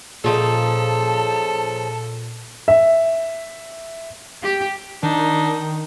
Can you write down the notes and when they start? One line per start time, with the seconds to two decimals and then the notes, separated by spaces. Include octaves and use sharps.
0.24 A#2 C#3 F3 D#4 A4 A5
2.68 E5
4.43 G4
5.03 D#3 D4 D#4